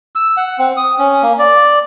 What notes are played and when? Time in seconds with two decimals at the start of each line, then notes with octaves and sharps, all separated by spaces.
0.15 E6
0.37 F#5
0.58 C4
0.77 D#6
0.99 C#4
1.23 A#3
1.39 D5